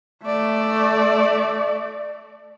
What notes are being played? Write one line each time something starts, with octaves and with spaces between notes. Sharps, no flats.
A3 D5